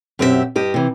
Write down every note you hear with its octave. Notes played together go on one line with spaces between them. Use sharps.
F#2 B2 C4 G4 G#4 E5
G2 G4 D#5
C3 E3